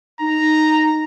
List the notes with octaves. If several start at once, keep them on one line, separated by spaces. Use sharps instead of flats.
D#4 A#5